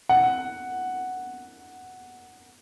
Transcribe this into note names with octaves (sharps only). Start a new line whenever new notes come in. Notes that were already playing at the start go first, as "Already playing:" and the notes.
F#5